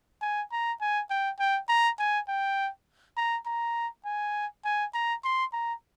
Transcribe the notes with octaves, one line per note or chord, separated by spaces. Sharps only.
G#5
A#5
G#5
G5
G5
A#5
G#5
G5
A#5
A#5
G#5
G#5
A#5
C6
A#5